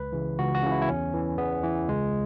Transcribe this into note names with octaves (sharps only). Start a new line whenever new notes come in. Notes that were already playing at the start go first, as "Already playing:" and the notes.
Already playing: C#2 B4
C#3 E3
C#2 F#4
F#4
C#3 E3
E4
E4
E2 C#4
E3
E2 B3
E3
C#2 G#3